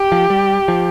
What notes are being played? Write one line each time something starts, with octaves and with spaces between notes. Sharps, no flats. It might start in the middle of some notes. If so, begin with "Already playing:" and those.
Already playing: G4
F3
G3
F3